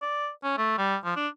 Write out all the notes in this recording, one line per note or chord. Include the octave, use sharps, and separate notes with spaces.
D5
C#4
A3
G3
F3
D4